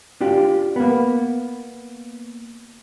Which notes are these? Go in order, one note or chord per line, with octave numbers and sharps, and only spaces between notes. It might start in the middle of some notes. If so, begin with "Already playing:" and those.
D4 F4 G4
A#3 B3